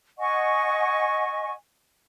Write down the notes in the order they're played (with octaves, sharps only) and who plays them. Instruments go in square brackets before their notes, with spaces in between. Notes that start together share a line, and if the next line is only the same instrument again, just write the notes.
[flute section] D#5 F#5 G#5 C#6